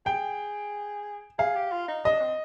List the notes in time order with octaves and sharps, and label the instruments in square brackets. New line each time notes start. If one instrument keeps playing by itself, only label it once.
[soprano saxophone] G#4 [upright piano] G5
[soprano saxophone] G#4 [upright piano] F5
[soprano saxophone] G4
F4
D#4
[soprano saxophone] D4 [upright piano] D#5
[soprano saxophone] C4